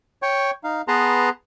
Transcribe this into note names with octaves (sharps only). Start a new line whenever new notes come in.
C#5 G5 C#6
D#4 F5
B3 G#4 B4 A5 A#5 C6